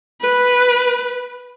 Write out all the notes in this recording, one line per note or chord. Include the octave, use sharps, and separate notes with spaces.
B4